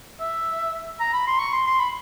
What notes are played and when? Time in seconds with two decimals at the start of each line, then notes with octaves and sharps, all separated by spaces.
0.20 E5
1.00 A#5
1.13 B5
1.27 C6
1.39 C#6
1.53 C6
1.67 C6
1.79 B5